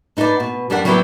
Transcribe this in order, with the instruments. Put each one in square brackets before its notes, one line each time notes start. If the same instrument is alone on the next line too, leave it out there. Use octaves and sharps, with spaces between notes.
[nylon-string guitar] D4 D#4 A4 B4 D5
B2
F#2 G3 D4 G4 A#4 F#5
F#3 G3 B3 E4 F#4 G4